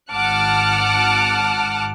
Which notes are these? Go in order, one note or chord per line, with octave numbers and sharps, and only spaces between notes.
G#1 F#5 A5 D6 F6 F#6